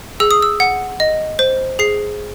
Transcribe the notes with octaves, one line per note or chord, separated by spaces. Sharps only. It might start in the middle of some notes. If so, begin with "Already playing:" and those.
G#4 E6
D#6
E6
F#5
D#5
C5
G#4 C7